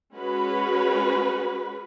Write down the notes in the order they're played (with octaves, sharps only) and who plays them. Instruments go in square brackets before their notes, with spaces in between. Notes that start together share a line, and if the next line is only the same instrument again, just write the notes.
[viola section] G#3 C#4 F#4 B4